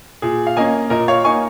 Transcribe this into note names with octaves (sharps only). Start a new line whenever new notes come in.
A#2 G#4
F5
A#3 C#4 D#5 G#5
A#2 A#4 D#5
C#5 F5
A#3 D#4 G#5 C#6